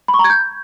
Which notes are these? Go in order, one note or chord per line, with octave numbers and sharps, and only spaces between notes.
B5
C#6
A#5
G#6
G6